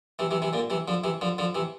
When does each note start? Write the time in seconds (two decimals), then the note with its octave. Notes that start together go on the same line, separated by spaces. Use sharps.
0.19 C3 E3
0.31 C3 E3
0.42 C3 E3
0.53 A#2 D3
0.70 C3 E3
0.88 D3 F3
1.04 C3 E3
1.21 D3 F3
1.38 D3 F3
1.55 C3 E3